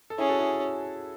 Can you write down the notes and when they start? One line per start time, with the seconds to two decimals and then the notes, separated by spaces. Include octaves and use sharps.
0.10 A4
0.18 C#4 E4 G#4
0.29 F#4 A4
0.39 E4 G#4